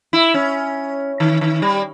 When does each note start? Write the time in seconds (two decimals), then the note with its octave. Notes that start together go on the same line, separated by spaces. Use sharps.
0.13 E4
0.34 C#4
1.20 D#3
1.41 D#3
1.62 G3